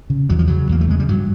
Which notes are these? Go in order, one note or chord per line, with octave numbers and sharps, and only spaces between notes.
C#3
E2 F#3
F3
C#3 F#3
E2 A#3
A3
C#3 G#3
G3
G2 F#3